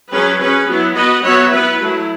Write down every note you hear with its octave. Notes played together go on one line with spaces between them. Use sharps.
F#3 C#4 G#4 B4
C#4 G#4 B4
F#3 B3 E4
B3 F#4 B4 D#5
F#3 B3 F#4 C#5 E5
B3 E4 B4
F#3 A3 E4